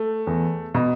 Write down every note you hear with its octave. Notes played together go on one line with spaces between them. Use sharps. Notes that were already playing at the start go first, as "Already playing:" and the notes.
Already playing: A3
E2
B2